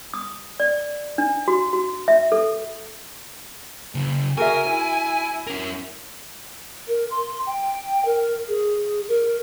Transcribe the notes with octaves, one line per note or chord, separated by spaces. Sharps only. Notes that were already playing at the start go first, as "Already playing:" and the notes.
D#6
D5
D4
F#4
F#4
E5
A4
C#3 A#3
F#4 G#4 A#4 E5 G#5
E4
C#4 A#4
A#4
C6
G5
A#4
G#4
A#4